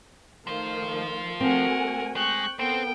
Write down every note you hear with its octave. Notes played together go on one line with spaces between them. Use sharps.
D#3 F3 A3 C5 F5
A3 C4 F#4 A#4 F#5 G#5
G#3 G5 C#6 F#6
B3 C4 A4 A#4 G5